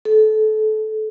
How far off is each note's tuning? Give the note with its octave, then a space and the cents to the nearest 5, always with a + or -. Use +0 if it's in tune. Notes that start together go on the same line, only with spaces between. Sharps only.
A4 -25